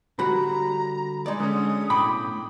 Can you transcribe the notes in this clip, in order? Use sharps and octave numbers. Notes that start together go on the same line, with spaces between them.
D3 G3 F#4 A#5 B5
G#3 D#4 D5
D3 C#4 D#6
B1 A2 G5 B5 D6